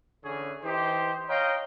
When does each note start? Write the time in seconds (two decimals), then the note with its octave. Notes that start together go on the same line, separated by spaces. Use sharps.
0.24 D3 E3 C#4 G#4 C#5
0.64 E3 D#4 G4 C5
1.28 C#5 D#5 F5 G5 A#5